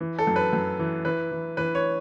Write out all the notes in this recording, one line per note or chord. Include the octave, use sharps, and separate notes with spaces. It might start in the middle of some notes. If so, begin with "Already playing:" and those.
E3
A4
F#2
B4
F#2
E3
E3 B4
E3
E3 B4
C#5